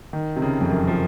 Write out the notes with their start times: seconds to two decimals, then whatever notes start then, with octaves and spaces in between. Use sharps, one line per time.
0.13 D#3
0.36 C3
0.42 C#3
0.61 F2
0.70 F#2
0.87 F3